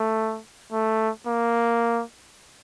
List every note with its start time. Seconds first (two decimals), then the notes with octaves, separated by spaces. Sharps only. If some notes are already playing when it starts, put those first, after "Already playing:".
Already playing: A3
0.72 A3
1.27 A#3